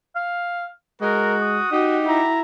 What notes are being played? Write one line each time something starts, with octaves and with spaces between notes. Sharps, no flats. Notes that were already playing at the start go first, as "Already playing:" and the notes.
F5
G#3 F#4 A#4
D#6
D#4 F#4 G4
E4 A#5